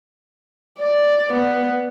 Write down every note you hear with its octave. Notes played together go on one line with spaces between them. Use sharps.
D5
B3